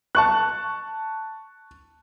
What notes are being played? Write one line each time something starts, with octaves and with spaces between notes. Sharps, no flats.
A5 C#6 F#6